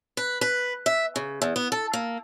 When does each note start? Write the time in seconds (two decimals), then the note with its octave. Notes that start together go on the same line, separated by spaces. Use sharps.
0.17 B4
0.41 B4
0.86 E5
1.16 C#3
1.42 E2
1.56 B3
1.72 A4
1.93 A#3